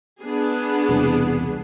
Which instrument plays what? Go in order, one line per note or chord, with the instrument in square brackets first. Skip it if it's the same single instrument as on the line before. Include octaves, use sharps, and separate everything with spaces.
[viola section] B3 D4 G#4
[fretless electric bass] E1 C2